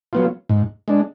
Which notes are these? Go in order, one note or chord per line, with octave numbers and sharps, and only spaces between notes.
F#3 B3 F4
G#2
G#3 D4